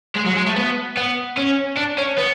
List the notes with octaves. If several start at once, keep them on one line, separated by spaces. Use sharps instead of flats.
G#3
F#3
G#3
A3
B3
B3
C#4
D4
C#4
B3